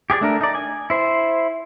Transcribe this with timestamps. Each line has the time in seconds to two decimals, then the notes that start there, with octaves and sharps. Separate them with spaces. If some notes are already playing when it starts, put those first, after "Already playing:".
0.10 G4 G#4 B4 D5
0.21 A3 D4 A#4
0.41 D#4 D5
0.55 G#5
0.90 E4 C5